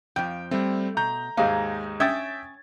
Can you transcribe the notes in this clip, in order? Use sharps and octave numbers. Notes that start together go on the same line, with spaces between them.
F2 F3 G5
G3 A3 C4
B2 A#5 G6
D#2 G#2 G#3 F5
C#4 E5 G5 D#6 G#6 A6